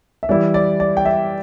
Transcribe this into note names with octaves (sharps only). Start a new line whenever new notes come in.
E5
E3 G3 E4 D5
D5
D5
G5
E5